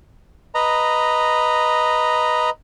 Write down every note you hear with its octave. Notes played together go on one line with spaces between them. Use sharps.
B4 D#5 A#5